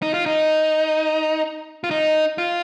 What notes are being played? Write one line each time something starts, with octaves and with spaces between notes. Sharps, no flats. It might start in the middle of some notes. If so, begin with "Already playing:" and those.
D#4
F4
D#4
F4
D#4
F4